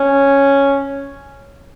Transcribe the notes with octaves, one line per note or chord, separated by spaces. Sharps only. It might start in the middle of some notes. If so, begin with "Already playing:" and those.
Already playing: C#4